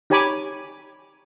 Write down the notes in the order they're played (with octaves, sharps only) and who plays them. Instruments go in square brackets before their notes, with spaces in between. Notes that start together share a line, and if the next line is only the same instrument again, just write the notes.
[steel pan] D#4 G4 C#5 G#5 B5 D6